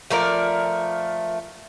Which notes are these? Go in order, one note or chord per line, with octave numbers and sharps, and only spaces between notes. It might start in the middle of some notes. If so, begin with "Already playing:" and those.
F3 A3 A#4 D5